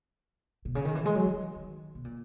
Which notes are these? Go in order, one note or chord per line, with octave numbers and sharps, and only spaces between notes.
B2
C#3
D#3
E3
G#3
F#3
E3
D#3
B2
A#2